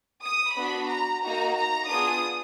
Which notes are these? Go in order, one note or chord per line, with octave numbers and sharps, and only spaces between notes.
D#6
B3 D4 F#4 B5
A#5
A#3 D#4 F#4 A#5
A#5
B3 D4 F4 G#4 D#6